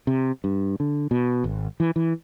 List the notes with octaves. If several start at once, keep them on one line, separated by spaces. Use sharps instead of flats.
C3
G2
D3
B2
G#1
E3
E3